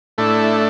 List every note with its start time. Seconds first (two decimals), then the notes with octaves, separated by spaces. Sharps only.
0.18 A2 A3 D4 E4